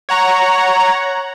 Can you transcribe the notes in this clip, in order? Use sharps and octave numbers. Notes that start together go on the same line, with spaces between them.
C#5 F#5 A#5